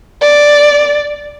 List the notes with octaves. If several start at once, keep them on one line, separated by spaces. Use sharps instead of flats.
D5